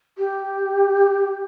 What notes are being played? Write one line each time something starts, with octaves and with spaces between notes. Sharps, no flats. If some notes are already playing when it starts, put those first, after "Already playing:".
G4